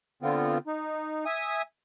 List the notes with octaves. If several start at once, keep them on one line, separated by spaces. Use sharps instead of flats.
D3 B3 C4 F4
D#4
E5 G#5 D#6